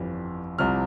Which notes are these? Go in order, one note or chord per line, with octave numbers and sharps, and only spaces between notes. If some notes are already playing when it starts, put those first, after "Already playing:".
Already playing: G1 F2 E3 G3
C2 C3 F3 F6